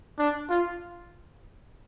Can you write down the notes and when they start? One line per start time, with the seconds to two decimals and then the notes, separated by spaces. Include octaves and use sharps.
0.18 D4
0.50 F4